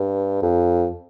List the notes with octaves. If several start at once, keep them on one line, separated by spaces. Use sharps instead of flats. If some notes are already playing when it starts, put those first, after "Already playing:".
Already playing: G2
F2